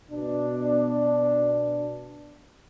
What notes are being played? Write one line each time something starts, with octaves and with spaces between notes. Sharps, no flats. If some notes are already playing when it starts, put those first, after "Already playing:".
B2 D4